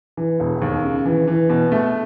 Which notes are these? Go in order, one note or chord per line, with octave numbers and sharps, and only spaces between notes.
E3
E1
D#2
C#3
E3
E3
B2
A3